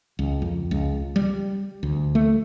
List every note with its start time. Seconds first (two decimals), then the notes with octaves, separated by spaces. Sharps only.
0.19 C#2
0.42 F2
0.71 C#2
1.16 G3
1.83 D2
2.15 A3